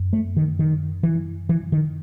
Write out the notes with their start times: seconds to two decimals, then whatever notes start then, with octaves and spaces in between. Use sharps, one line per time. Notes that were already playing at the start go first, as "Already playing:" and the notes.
Already playing: F#2
0.13 A3
0.37 D#3
0.59 D#3
1.03 E3
1.49 E3
1.72 D#3